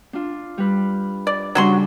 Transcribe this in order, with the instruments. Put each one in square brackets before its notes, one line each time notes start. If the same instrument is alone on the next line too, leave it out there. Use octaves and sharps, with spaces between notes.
[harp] D4 F4
G3 B4
[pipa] D5
[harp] C#3 G3 D4 [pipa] F#3 F#4 C6